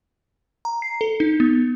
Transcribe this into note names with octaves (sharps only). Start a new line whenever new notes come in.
A#5
C7
A4
D#4
B3